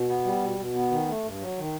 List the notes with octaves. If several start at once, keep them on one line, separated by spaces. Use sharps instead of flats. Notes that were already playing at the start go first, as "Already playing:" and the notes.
Already playing: B2
B3
G3
B2
B2
B3
D#3
A3
G2
F#3
D#3